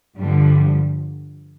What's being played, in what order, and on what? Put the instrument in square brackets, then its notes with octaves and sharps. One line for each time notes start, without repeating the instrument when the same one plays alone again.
[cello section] G2 D3 F3 G3